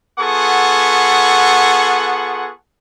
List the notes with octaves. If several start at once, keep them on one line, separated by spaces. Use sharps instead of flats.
B3 F4 G#4 A4 F#5 C#6